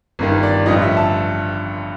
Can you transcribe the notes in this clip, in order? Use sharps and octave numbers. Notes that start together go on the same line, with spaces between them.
G1 G2 D#3
D5
A1 G2 D3 F3 D#5
E5
A5